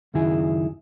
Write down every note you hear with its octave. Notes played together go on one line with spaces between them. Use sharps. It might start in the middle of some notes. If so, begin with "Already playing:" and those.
C#2 F#2 D#3 E4 G#4